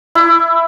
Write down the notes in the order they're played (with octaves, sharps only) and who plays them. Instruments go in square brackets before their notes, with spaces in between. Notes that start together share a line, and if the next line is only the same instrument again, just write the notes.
[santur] E4